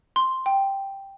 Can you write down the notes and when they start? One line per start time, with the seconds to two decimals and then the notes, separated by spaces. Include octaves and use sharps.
0.16 C6
0.46 G5